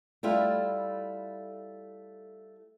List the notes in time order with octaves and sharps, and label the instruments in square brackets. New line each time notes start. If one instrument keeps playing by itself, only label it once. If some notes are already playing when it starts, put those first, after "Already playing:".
[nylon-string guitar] G3 A3 E4 F4